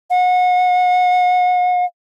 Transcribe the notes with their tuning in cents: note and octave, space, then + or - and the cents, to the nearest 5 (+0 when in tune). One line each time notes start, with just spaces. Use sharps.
F#5 -35